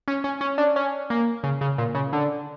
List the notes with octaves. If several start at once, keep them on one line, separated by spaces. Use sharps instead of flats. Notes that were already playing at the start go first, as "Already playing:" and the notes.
C#4
C#4
C#4
D4
C#4
A#3
C#3
C#3
A#2
C#3
D3